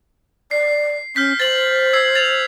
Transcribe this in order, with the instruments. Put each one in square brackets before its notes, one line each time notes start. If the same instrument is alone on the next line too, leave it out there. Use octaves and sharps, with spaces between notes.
[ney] D5 [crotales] C7
[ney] C#4 [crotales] F6 G6 B6
[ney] C5 [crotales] A6 F#7
[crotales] E6 G#6 C7
A6 F7